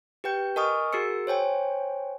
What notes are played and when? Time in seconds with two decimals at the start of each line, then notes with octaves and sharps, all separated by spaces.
0.24 G4 B4 G5 G6
0.56 A#4 D#5 G#5 C#6 D#6 F6
0.93 F#4 G#4 A#4 E6 C#7
1.27 C5 C#5 G5 G#5